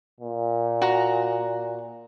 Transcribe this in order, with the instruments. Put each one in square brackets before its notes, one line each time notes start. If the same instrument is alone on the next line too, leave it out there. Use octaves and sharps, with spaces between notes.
[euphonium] A#2
[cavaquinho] F#4 A#5